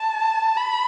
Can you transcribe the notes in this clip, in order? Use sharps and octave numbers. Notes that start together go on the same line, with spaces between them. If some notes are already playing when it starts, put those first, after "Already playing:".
Already playing: A5
B5